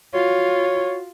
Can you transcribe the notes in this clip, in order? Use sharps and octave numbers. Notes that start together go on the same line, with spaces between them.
F4 F#4 C#5